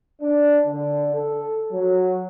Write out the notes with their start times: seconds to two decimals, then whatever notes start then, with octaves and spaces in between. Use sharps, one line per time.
0.22 D4
0.66 D3
1.14 A4
1.72 F#3